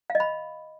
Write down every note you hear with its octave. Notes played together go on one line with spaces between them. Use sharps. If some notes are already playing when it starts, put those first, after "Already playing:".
F5
D#5
B5